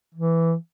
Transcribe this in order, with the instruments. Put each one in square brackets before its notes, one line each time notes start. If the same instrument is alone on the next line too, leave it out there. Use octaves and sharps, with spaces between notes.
[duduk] E3